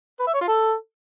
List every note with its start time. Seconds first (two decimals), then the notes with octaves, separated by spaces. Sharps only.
0.20 B4
0.27 E5
0.34 C#5
0.41 F4
0.48 A4